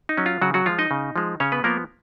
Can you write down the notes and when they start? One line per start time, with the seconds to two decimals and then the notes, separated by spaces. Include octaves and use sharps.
0.09 D#4
0.17 F#3 C#4
0.26 F4
0.42 C#3 F#3 F#4
0.54 F#3 F#4
0.66 F3 G#3 F4
0.79 D#4 D#5
0.91 C#3
1.16 F3 G#3
1.40 C#3 C#4 C#5
1.52 B3 B4
1.64 F3 A#3 B3 A#4